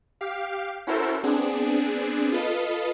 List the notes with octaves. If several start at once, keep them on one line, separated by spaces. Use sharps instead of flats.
G4 F5
C#4 E4 F#4 A4 A#4 C5
B3 C4 D4 G#4
F4 A4 B4 D#5